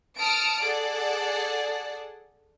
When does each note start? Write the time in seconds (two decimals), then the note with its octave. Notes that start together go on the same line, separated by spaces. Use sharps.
0.18 A5 D#6 F6 C#7 D7
0.62 G#4 A4 D5 F#5